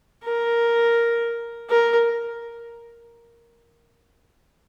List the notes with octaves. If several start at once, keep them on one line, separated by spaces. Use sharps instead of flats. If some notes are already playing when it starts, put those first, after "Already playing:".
A#4
A#4